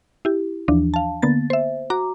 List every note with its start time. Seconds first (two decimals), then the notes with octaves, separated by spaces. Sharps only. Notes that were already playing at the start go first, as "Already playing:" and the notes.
0.25 E4 G4
0.68 D#2 E3 F3 D4
0.94 F5 A5
1.22 D3 A#3 B3 A6
1.50 C5 E5
1.90 F#4 A#5 D6